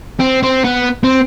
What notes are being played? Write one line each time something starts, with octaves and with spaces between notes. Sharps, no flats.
C4
C4
B3
C4